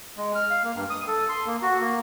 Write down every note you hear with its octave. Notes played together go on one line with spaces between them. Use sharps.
G#3
F6
F5
A#3
G2
D#6
A4
C6
A#3
F#4
A#3